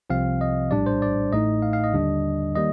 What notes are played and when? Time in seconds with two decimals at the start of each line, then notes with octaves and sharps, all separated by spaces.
0.10 C2 C3 F3 C4 F5
0.41 D#5
0.71 A#1 A2 G3 D4 D5
0.86 C5
1.02 D5
1.33 A1 A2 A3 D#4 D#5
1.62 F5
1.73 F5
1.84 D#5
1.94 D#2 D3 G3 D4
2.55 D#3 G3 A#3 D#5